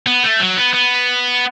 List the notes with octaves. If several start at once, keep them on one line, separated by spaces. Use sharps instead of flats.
B3
A3
F#3
B3
B3